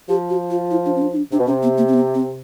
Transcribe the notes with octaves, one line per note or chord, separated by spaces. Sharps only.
F3 G4
F#4
F4
E4
D4
C#4
D4
D#4
D4
C3 D4
B2
C3 C#4
B3
A#3
C4
B3
C4